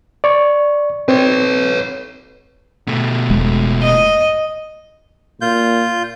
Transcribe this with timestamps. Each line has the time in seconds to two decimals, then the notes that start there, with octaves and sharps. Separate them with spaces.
0.24 D5 C#6
1.09 C4 B4 C#5
2.87 B2 A3
3.30 E1 G#3
3.83 D#5
5.41 A#2 F4 G6